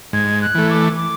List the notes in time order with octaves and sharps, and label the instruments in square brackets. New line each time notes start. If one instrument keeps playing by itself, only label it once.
[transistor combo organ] G#2 [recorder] G#6
[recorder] F#6
[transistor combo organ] E3 A3
[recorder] D6
D6